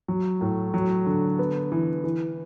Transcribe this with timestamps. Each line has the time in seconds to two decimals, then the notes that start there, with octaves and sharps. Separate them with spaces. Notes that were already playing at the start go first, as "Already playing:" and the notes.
0.08 F#3
0.41 A2
0.74 F#3
1.06 D3
1.39 B3
1.72 E3
2.04 E3